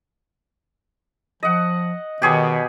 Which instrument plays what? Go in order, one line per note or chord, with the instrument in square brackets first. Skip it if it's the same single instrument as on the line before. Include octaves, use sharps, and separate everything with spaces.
[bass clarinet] F3 [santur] D#5 F#5
[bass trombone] B2 [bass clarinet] D#3 [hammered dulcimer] G4 G#4 C#5